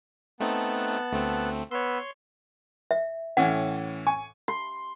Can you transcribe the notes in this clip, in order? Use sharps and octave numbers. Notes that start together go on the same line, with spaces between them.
A3 B3 C4 D#4 A5 F#6
D2 A3 C4
B3 B4 C#5 C6 E6
E5
A2 E3 C#4 F#5
G#5 C#6
C6